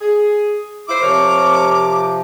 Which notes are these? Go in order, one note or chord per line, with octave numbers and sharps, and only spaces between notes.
G#4
E4 F4 C5 D6
C3 F3 A#4 C#5